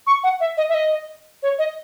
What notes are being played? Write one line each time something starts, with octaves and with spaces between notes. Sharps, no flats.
C#6
F#5
E5
D#5
E5
D#5
C#5
D#5